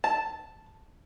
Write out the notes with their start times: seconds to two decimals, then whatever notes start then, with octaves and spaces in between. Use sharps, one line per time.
0.04 A5